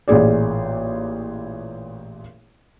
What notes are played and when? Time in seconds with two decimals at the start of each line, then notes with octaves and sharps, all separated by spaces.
0.08 A1 A#2 G#4 D5